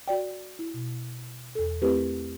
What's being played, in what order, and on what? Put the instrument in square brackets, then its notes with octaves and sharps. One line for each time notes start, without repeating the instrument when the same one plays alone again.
[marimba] F#4 D5 G5
E4
B2
E2 A4
A3 C4 E4 G4 A#4 B4